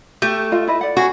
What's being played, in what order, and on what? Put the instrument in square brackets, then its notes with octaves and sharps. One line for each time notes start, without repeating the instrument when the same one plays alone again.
[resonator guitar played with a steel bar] A3 [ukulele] G4
[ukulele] F4 D#5
E4 B4 D#5
D5 F#5
[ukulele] C#4 G#4 [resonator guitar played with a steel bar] F#4